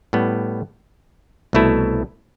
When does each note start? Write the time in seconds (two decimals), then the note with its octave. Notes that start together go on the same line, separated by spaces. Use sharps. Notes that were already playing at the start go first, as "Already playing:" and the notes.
0.13 A2 G3 B3
1.53 C2 B2 A3 E4